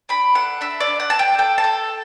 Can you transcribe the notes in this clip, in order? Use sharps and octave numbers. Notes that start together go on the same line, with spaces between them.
D4 B5
A4 F#5
D4 E5
D5
D4
F#5
A4 A5
G5
A4 G5
A5
A4